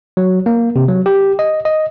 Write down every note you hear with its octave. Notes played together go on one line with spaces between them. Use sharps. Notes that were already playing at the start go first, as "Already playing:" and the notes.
F#3
A#3
C3
F#3
G4
D#5
D#5